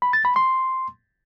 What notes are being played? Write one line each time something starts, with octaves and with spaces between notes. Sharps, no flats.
B5
A6
B5
C6